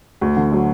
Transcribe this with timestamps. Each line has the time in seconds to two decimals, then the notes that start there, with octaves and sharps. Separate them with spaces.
0.21 D2
0.36 D3
0.52 F#3